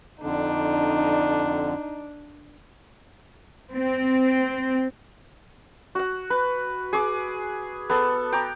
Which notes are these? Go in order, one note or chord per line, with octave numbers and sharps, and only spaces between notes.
F2 D3 D4 D#4
C4
F#4 F#5
B4
G#4 D6
B3 A4
G5 A#5 D6